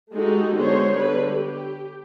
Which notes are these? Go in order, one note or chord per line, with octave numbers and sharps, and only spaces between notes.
G#3 A3 D#4 F#4 G4 A4
D3 G#3 B3 C5 C#5
D3 G3 B4
G4